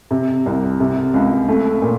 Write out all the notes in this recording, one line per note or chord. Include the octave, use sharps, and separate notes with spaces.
C3
C2
C3
C#2
A3
A#2